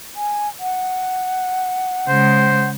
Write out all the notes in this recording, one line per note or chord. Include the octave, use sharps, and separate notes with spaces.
G#5
F#5
C#3 G#3 C5